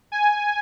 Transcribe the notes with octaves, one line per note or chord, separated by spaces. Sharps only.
G#5